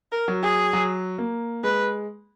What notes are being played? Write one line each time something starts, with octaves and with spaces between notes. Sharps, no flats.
A#4
F#3
G#4
F#3
A#3
G#3 B4